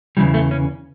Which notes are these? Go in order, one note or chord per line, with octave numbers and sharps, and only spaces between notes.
E2 C#3 E3 G3
A3
C#4